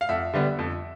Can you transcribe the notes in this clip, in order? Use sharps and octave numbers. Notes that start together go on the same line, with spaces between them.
F5
F2 E5 F#5
D3 G3 B3
F2